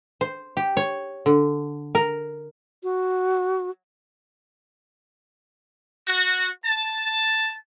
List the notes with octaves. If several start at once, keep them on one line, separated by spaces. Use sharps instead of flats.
C5
G4
C#5
D3
A#4
F#4
F#4
A5